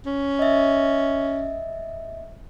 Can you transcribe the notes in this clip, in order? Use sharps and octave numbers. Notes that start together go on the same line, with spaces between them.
C#4
D#5 E5